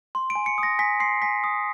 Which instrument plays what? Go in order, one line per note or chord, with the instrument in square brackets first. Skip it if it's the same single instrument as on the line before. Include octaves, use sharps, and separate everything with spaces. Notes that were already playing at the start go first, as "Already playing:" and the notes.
[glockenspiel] C6
D7
G#5
C#7
D#6
A#6
G#5 B6
C6 C7
G#5 B6
D#6